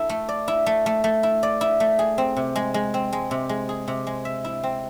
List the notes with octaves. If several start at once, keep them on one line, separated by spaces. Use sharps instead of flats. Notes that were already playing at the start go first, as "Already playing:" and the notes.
Already playing: E4 A4
A3
D5
E4
A3
A3
A3
E4
D5
E4
A3
G#4
C4
C3
G#3
G#3
C4
G#3
C3
G#3
G#4
C3
G#3
E5
E4
C4